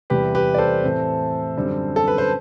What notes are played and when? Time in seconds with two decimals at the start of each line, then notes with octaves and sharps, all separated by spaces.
0.10 E2 C3 E3 G3 G4 B4
0.35 G4 B4
0.54 D5
0.58 A4 C5
0.84 A2 E3 A3 C4
1.56 F#2 D3 G3 C4
1.96 A4
2.08 B4
2.18 C5